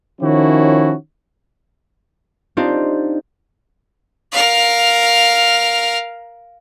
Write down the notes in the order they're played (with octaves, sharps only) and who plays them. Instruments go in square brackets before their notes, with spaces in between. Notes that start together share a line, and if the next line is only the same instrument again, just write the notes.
[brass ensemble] D#3 F3 C#4 E4 F#4 C#5
[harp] C4 D4 D#4 F4 G4 C5
[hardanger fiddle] A#4 F5